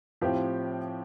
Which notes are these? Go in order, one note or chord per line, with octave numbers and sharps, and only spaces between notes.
A2 F3 C4 G4